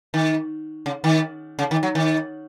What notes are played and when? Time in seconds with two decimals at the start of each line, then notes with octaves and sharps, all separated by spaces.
0.14 D#3
0.86 C#3
1.04 D#3
1.59 C#3
1.71 D#3
1.83 F#3
1.95 D#3